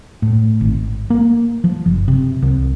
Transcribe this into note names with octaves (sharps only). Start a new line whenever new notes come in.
A2
G#1
A#3
F3
F#1
C3
C2